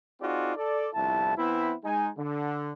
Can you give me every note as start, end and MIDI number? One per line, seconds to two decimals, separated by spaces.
0.21 0.56 60
0.21 0.56 63
0.21 0.56 65
0.21 0.56 66
0.21 0.56 68
0.21 0.56 74
0.56 0.88 69
0.56 0.88 74
0.94 1.36 31
0.94 1.36 36
0.94 1.36 41
0.94 1.36 64
0.94 1.36 81
1.37 1.74 52
1.37 1.74 59
1.37 1.74 60
1.37 1.74 64
1.84 2.09 56
1.84 2.09 63
1.84 2.09 80
2.18 2.73 50